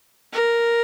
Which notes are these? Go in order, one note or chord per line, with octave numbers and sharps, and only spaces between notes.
A#4